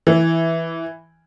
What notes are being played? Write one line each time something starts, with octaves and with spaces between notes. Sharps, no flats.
E3